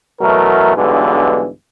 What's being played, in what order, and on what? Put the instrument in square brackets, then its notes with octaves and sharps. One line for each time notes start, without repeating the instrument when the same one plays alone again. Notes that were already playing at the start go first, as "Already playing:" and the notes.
[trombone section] B2 E3 F#3 A3 A#4
B1 G2 B2 D3 E3 G#3